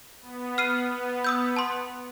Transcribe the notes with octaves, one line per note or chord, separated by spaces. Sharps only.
B3
F6 C7 D#7
D#6 E6 G6
A5 C6